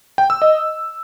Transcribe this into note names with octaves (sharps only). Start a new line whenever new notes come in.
G5
E6
D#5